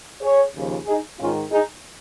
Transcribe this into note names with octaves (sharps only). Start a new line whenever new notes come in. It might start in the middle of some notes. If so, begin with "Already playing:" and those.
G#4 C#5
D#2 C#3 F3
D#4 G#4
G#2 D#3 C#4 F4
D#4 G#4